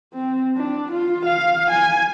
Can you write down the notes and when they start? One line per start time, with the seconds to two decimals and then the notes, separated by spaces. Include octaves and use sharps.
0.14 C4
0.57 D4
0.92 F4
1.26 F5
1.71 G#5